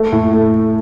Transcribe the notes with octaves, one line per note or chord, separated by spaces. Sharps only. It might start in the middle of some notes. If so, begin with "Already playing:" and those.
Already playing: A3
A2
A3